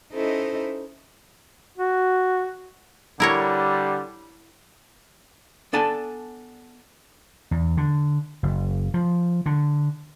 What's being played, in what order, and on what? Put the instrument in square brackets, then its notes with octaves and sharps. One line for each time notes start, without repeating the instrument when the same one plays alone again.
[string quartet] C#4 D#4 E4 A4 C5 D#5
[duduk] F#4
[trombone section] D3 G3 [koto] E4 A#4 C#5
[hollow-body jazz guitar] B3 D4 A4 G#5 A5
[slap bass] E2
D3
F#1
F3
D3